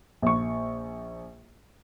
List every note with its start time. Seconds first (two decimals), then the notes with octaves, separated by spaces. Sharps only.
0.22 A#1 C#6